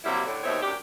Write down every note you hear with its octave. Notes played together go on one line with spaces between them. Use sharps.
C3 F#3 G3 A#3 E4
A2 D3
D#2 B2 C4 D#4 C#5 E5
F#2 A2 D4 G4